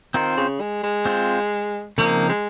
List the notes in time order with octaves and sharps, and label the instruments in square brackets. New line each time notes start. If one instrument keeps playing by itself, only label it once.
[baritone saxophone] D#3 [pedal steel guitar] C4 F4 C5
[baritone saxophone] C#3
G#3
G#3
[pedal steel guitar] C4 F4 C5
[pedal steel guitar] C#3 F3 C4 D#4 [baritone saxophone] A#3
[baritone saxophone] G#3